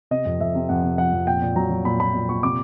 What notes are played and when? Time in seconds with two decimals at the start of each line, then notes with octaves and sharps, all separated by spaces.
0.11 C3 D#5
0.26 F2
0.40 F2 E5
0.55 C3
0.69 F2 F#5
0.83 C3
0.98 F3 F#5
1.13 F2
1.27 A#2 G5
1.42 A#2
1.56 F#3 A#5
1.71 F#3
1.85 A#2 B5
2.00 A#2 B5
2.14 A#2
2.29 A#2 C#6
2.43 C3 D6